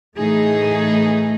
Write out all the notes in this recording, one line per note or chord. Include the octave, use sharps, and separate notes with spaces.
A2 E3 A3 D#4 G#4